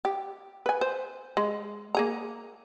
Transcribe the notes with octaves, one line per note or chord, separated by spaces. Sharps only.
G4
B4 G#5
C5
G#3
A#3 G#4 A#5